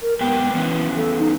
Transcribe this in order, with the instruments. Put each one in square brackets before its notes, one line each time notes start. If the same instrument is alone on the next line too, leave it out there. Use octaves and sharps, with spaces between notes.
[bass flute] A#4
[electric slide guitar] G#2 B4 G5 [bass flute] B3
[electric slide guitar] E2 B3 C#4 [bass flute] E3
[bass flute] A4
D#4